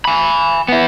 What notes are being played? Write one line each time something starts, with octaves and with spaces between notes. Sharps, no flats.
G#5 B5
B3 E4